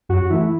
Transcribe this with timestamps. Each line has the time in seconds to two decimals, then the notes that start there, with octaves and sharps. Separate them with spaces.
0.09 F#2 F#4
0.23 F#4
0.30 E3 A3 E4